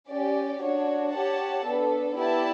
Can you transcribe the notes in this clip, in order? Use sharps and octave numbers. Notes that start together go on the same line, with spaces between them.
C#4 G4 D5
D4 F#4 C#5
G4 C#5 F#5 A5
B3 D4 A4
B3 E4 G4 D5 A5